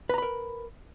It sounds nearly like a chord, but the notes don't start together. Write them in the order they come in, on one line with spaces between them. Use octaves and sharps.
B4 A#5 B5 A#4